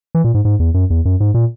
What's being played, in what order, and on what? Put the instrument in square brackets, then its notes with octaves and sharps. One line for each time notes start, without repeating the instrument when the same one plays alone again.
[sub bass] E3
A#2
G#2
G#2
E2
F#2
E2
F#2
G#2
A#2